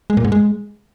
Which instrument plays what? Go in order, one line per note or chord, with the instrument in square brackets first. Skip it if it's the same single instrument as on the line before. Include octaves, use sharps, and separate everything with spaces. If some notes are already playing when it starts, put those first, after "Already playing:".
[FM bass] G#3
A#2
G#2
G#3